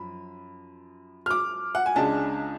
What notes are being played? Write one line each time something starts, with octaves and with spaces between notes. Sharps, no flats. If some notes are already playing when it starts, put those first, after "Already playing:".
Already playing: F#2 F3 B5
F6
D6
F#5
G#5
C#2 C#3 G#3 D4 A5